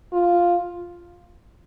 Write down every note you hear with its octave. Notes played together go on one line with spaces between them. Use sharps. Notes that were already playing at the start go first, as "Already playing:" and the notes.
F4